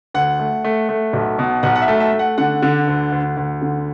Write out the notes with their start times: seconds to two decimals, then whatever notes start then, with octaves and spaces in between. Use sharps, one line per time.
0.14 D2 F#5
0.39 A3
0.65 A3
0.89 A3
1.13 B1
1.39 B2
1.63 B1 F#5
1.75 F#5
1.82 E5
1.88 A3
2.00 E5
2.13 A3
2.19 F#5
2.38 D3 F#5
2.62 D3
2.87 D2
3.12 D2
3.37 D2
3.62 D3